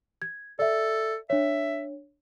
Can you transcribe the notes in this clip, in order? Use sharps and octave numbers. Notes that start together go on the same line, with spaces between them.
G#6
A4 D5 E5
D4 C#5 E5